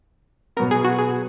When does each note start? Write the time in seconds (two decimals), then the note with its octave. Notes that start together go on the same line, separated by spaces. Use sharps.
0.57 B2 F#3 B3 A#4
0.71 G#4
0.84 F#4
0.98 G#4